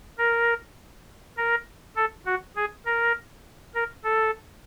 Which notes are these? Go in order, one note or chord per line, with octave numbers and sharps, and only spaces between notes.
A#4
A#4
A4
F#4
G#4
A#4
A#4
A4